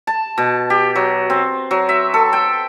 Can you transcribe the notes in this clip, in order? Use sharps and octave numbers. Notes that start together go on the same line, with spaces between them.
A5
B2
G4
F#3
C4
F#3
E5
A4
G5